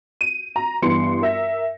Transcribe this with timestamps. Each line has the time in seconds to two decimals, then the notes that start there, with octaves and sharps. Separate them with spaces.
0.21 D#7
0.56 A#5
0.82 G2 E3 B3 C6 C#7
1.21 A#4 E5 A#6